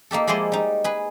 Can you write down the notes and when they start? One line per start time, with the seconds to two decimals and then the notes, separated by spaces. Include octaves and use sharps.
0.11 A#3 D#4 G4 A4
0.27 F3 G#3 E4 D5 D#5 C6
0.52 G3 D#4
0.84 G#4 B4